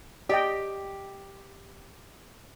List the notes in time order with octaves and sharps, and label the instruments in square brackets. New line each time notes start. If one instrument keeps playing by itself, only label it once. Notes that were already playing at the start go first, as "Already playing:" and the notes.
[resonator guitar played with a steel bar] G4 [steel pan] D5 D#5 G5